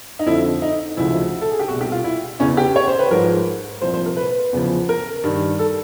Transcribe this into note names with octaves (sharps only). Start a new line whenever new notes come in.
D#4
F2 D3 F3 E4
D#4
D2 C#3 F3 E4
A4
G#4
G4
C2 B2 F#4
G4
F4
E4
E2 C#3 E3 C#4
G4
C#5
C5
B4
G#2 F3 A#4
C2 A#2 F3 C5
C5
A#4
B4
E2 C#3 F3
A#4
G2 D#3
A4